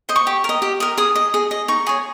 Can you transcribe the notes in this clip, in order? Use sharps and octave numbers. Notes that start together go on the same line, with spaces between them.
C5 D#5
C#6
G4
A#4 D#5
G4
A#4 D#5
G#4 D#6
D#5
G#4
D#5
D#4 C#6
G#4 C#5